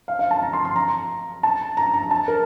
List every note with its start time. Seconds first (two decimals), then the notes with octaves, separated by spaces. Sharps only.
0.08 F5
0.19 F5
0.31 A5
0.42 A#5
0.53 C6
0.65 C6
0.76 A#5
1.43 A5
1.77 A#5
1.94 A#5
2.11 A5
2.28 A#4